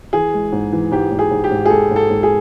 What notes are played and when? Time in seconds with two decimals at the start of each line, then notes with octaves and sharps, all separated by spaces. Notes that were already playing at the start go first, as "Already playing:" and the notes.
0.13 E3 G#4
0.34 G#3
0.52 G#2
0.73 E3
0.91 G#2 G4
1.11 G#2
1.19 G#4
1.31 G#2
1.44 G4
1.51 G#2
1.65 G#4
1.70 G#3 A4
1.91 G#2
1.96 A4
2.10 G#2
2.23 G#4